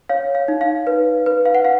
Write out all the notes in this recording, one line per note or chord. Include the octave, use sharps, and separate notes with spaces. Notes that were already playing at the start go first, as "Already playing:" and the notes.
C#5 F5
F5
D#4
F5
B4
B4
F5
F#5
F5